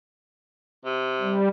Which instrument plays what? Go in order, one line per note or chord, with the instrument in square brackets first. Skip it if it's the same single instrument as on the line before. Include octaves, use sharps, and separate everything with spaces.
[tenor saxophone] C3
[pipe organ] G3